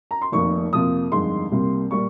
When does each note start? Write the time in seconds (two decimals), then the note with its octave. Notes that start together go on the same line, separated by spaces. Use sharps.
0.11 A#5
0.22 C6
0.32 F1 F2 D#3 A#3 C#6
0.73 F2 C3 F3 A#3 D#6
1.11 G1 F2 D#3 G#3 C6
1.51 C2 C3 G3 A#3
1.91 A#2 G3 A#3 C#6